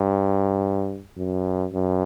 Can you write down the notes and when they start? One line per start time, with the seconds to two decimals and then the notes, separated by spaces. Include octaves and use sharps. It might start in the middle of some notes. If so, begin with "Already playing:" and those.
Already playing: G2
1.17 F#2
1.73 F#2